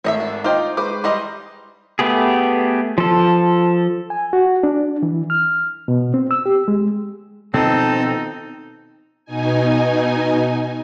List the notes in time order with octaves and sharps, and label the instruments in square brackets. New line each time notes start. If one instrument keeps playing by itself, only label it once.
[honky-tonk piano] G#1 A3 [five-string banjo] C#5 D#5 E5
[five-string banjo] D4
[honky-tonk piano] D#4 [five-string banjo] F4 C5 [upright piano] D#5 G5 D6
[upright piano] G#3 [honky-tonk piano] B4 C#6 D6 [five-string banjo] C5
[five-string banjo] E3 G3 D#5 [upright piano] A#5 C6
[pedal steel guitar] A3 B3 G4 G#4
F3 A4
[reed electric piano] G#5
F#4
D4
E3
F6
B2
C4
E6
G4
G#3
[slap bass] B2 D#3 F3 [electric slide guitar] C4 [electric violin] D#4 [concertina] A4 A5
[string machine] B2 D#4 G#5